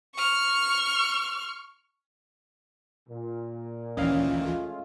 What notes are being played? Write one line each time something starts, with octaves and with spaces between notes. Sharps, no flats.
C#6 F6
A#2
D2 D#3 E3 C#4 D#5 F5
G#3 A3 F4